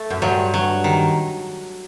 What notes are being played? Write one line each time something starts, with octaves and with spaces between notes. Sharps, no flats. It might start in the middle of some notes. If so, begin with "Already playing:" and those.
Already playing: A3
F#2
G2 F#3
F#3
D#3